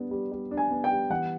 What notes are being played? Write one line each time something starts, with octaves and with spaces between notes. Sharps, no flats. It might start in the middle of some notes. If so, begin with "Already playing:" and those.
Already playing: G3 B3 D4
G3
G3
D4
G#5
B3
G5
G3
E3 F#5